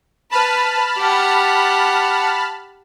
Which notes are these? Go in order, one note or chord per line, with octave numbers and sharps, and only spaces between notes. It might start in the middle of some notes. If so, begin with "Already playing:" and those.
B4 A5 B5 F6
G4 F#5